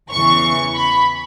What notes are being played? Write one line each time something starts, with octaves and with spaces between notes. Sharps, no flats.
E2 C#3 E3 C#6
B5